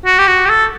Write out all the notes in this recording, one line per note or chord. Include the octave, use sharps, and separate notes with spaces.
F#4
G4
F#4
G4
A4